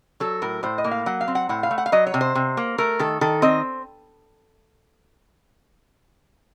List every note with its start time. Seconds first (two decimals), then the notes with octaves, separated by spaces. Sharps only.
0.20 F#3 A4
0.42 A2 A#4
0.63 A2 C5
0.78 D#5
0.84 A#3
0.91 F5
1.06 F#3 F#5
1.21 F5
1.28 C4
1.35 F#5
1.49 A2 F#5
1.63 F5
1.71 A3
1.78 F#5
1.86 F5
1.92 F#3 D#5
2.07 C#5
2.14 C3
2.21 C5
2.35 C3
2.57 A#3
2.78 A3 A#4
2.99 D#3 A4
3.21 D#3 A4
3.42 C4 D#5